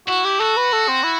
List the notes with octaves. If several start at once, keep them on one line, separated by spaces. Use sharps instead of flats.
E4 F#4
G4
F#4 A4
B4
A4
C4
E4